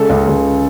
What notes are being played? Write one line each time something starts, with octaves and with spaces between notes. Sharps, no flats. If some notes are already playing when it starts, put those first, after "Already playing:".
Already playing: C#3 G#3 A4
C#2
C#2